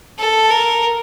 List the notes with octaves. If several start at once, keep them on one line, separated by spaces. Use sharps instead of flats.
A4
A#4